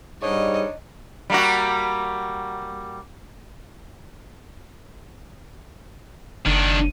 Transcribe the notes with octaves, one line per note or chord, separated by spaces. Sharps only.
G#2 G3 D4 D#4 C#5 D#5
G3 A#3 F#4
F#1 D#3 D4